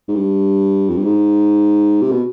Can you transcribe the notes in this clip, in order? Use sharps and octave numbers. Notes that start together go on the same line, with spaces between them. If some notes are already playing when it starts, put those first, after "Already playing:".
G#2
G2
F2
G2
G#2
C3
B2